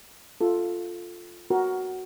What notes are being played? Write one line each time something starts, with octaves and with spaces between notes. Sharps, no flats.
F4 A4
F#4 A#4